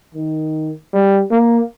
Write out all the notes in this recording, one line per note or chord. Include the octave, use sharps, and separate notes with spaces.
D#3
G3
A#3